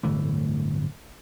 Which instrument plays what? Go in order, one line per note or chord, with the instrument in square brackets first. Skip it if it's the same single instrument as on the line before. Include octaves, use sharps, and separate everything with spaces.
[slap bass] D1 G1 E3 A3